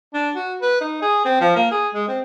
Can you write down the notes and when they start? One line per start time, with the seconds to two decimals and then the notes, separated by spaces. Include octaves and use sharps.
0.14 D4
0.36 F#4
0.62 B4
0.81 D#4
1.02 G#4
1.25 C4
1.41 F3
1.56 A#3
1.71 G#4
1.94 G#3
2.08 C4